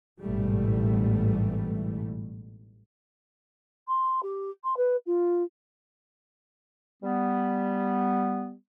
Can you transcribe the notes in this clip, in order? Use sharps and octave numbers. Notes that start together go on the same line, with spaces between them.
A1 G#2 B2 E3 G3 A3
C6
G4
C6
B4
F4
G3 B3